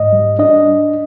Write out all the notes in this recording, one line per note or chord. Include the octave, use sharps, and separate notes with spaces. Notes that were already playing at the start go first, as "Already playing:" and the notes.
Already playing: G#2 D#5
G3
D4 D#5